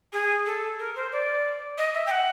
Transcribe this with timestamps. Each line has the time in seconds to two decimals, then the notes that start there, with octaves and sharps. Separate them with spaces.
0.12 G#4
0.46 A4
0.79 A#4
0.96 C5
1.12 D5
1.78 D#5
1.94 E5
2.06 G5
2.11 F#5